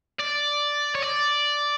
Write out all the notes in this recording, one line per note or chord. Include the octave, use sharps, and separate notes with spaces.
D5
C#5
D5